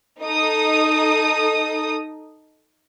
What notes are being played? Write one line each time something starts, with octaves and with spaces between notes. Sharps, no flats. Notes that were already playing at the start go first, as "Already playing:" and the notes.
D#4 A4 D#6